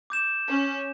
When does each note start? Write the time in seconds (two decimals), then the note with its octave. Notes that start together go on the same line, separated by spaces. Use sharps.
0.10 D6 G6 E7
0.47 C#4